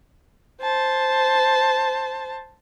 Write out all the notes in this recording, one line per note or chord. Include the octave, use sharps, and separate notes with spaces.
C5 A5